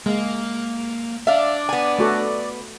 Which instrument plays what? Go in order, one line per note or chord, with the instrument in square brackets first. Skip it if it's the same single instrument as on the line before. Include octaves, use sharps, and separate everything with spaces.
[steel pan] G#3 [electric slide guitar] A#3
[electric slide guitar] D4 [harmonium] D5 [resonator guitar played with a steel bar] E5 F5
[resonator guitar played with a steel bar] B3 G#5
[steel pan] A3 F#4 A4